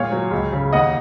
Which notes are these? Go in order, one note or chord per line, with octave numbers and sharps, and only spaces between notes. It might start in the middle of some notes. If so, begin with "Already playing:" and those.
Already playing: A#2 G#3 C#5 F5
F#3
C#2
C#3
D#2 D#5 F#5